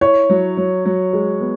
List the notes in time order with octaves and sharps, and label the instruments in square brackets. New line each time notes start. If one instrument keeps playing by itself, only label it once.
[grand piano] E4 [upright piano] C#5
[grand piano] F#3
F#3
F#3
G#3
B3